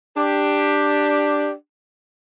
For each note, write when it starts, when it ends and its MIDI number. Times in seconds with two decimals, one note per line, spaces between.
0.17 1.52 62
0.17 1.52 67